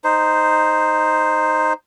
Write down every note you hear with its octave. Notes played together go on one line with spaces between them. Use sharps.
D#4 C5